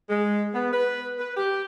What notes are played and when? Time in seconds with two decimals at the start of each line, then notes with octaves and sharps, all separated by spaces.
0.09 G#3
0.53 B3
0.72 B4
1.18 B4
1.36 G4